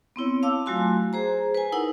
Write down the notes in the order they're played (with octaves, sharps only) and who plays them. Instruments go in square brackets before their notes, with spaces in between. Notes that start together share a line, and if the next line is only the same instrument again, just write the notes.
[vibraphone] B3 C4 E4 C#5
F5 A5 D6 E6
F#3 A3 F4 F#4 G#5 C6
G#4 C5 A#5
B4 G#5
D#4 E4 A#4 F#5 D#6